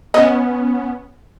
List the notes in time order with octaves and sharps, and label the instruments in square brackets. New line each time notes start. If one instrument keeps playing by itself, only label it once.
[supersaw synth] B3 C#4 [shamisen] D#5